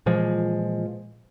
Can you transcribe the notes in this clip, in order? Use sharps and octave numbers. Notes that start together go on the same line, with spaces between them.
A#2 E3 F3 G#3